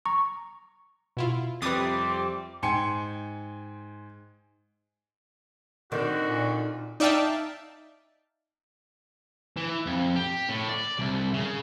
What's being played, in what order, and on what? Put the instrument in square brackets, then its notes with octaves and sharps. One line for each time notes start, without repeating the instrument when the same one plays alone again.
[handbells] A#5 C#6
[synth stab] B2 E4 F4
[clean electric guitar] F2 G3 [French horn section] C3 C4 [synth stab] B4 D#6 [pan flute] D6
[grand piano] G#2 G5 G#5 C6 C#7
[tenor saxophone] D3 [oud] D#3 C4 [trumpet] F#4
[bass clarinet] A#2
[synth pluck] D#4 D5 E5 F5 G5 A5
[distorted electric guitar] E3
F2
G4
A2
D5
C2
C#3